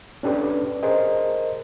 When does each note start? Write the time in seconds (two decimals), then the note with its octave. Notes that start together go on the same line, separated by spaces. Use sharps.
0.23 C#4 D4 G4 A4 B4 D5
0.83 G#4 A#4 C5 D#5